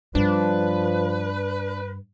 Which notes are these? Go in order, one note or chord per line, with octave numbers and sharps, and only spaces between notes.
G2 F3 D4 B4